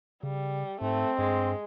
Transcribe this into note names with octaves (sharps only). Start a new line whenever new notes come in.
C#3 G3
G#2 A3 C4
G2 G#3